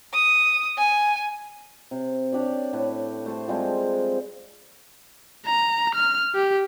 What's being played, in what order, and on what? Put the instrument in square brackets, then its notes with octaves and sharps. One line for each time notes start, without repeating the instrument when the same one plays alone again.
[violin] D#6
G#5
[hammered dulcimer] C3
D4 G4 C#5 D5
A2 A3 B4
A3 C5 A5
F3 G3 G#3 C4
[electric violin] A#5
F6
G4